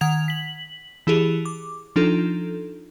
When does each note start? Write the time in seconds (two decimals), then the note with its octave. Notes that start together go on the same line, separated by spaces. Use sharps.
0.01 D#3 F#5 G#6 F7
0.28 B6 F#7
1.07 E3 E4 G4 G#4 F7
1.46 D6
1.96 F3 D4 D#4 F4 A4